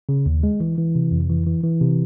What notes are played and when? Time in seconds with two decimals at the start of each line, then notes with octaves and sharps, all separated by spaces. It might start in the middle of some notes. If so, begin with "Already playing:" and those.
0.09 C#3
0.26 D#2
0.43 G#3
0.60 E3
0.78 E3
0.95 C3
1.11 F2
1.29 E3
1.46 E3
1.63 E3
1.81 C3